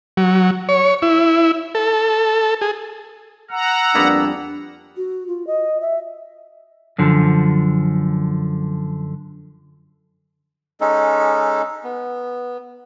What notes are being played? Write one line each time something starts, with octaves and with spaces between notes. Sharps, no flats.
F#3
C#5
E4
A4
G#4
F#5 A#5 E6
F2 G3 A#3 B3 D4
F#4
F4
D#5
E5
F#2 D3 F3
G#3 C#4 D#4 A4
B3